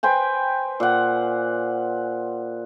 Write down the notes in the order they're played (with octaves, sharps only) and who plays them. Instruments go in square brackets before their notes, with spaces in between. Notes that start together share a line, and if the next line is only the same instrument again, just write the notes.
[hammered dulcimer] B4 C5 G5 G#5
A#2 F#5